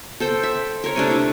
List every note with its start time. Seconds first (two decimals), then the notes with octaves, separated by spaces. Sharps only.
0.20 A4 C5 G5
0.43 E5
0.84 A#4 C#5
0.96 C3 A3 D4
1.10 E4